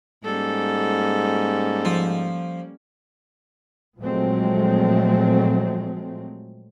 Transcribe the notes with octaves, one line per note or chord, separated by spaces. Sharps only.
G#2 G3 A#3 C#4 A4
F3
A#2 F3 F#3 G#3 A3 C4